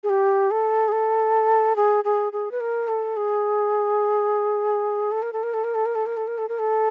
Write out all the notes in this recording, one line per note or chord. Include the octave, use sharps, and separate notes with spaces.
G#4
G4
A4
G#4
A4
G#4
G#4
G#4
B4
A#4
A4
G#4
A4
A#4
A4
A#4
A4
A#4
A4
A#4
A4
A#4
A4
A#4
A4
A#4
A4